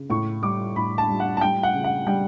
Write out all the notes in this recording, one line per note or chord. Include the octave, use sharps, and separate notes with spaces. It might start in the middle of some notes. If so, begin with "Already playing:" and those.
Already playing: C#3
A2 C#6
G3 D6
A2 B5
A5
G3
F#5
A5
G3 G5
F#5
C#3
F#5
G3 G5